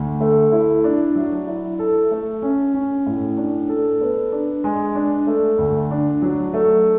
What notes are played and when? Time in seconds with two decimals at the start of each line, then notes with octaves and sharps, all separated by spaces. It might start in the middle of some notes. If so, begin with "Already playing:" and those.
Already playing: D2
0.20 A3
0.52 E4
0.84 D4
1.15 F#3
1.47 E4
1.79 A4
2.11 A3
2.42 C#4
2.74 C#4
3.06 A2
3.37 D4
3.69 A4
4.01 B3
4.32 D4
4.64 G#3
4.95 D4
5.27 A3
5.58 D2
5.91 D4
6.22 F#3
6.54 A3